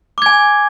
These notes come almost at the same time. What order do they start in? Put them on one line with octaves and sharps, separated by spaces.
D6 G#6 G#5